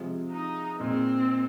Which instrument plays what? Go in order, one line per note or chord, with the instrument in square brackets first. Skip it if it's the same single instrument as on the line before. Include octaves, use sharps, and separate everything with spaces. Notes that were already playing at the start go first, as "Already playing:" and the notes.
Already playing: [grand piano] C3 F3 G#3 F4
[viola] D#4
[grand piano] A#2 G#3 D#4 [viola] C4